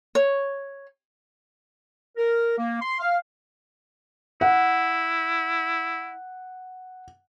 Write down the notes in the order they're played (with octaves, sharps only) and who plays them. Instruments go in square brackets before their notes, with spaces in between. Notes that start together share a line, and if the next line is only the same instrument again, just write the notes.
[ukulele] C#5
[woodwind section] A#4
A#3
C6
F5
[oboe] E4 [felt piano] F#5